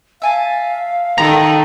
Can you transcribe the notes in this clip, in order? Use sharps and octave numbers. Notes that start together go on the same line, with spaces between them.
E5 F5 G#5 A5
D#3 A4 A#5